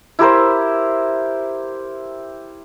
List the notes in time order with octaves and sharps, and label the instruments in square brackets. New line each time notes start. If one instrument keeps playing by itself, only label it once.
[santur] E4 G4 A#4 C5